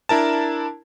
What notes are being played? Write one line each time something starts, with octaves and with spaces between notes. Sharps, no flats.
D4 E4 A#4 A5